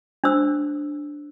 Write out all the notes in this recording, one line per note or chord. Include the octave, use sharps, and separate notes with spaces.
D4 C5 E6